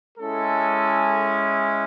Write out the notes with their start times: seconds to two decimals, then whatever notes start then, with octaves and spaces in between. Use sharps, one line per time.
0.18 G#3 C#4 E4 A4